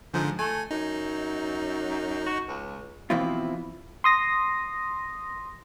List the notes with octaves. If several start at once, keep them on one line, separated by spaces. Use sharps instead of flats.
G#2 D3 F3
A3 G#5
F#2 D#4
F#4
C#2
B2 E3 F3 C4 E4 F4
C6 D#6 A#6